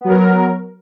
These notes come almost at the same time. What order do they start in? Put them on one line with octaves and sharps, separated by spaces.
B3 F#3 A#4